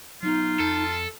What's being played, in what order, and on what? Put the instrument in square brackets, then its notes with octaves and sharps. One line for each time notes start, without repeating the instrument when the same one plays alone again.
[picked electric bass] F#3 B3 [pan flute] D#4 [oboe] F4
[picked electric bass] F2 [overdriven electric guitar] A4